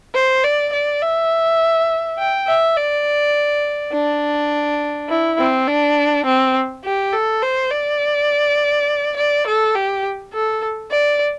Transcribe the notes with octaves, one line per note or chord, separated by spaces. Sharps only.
C5
D5
D5
E5
G5
E5
D5
D4
E4
C4
D4
C4
G4
A4
C5
D5
D5
A4
G4
A4
D5